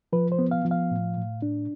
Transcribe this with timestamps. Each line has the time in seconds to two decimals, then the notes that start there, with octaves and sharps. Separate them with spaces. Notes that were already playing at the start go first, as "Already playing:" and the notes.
0.13 F3 B4
0.32 C5
0.39 B3
0.51 F5
0.64 F3
0.71 F5
0.91 A2
1.17 A2
1.42 D4